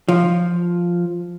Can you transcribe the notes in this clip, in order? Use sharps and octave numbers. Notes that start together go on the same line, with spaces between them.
F3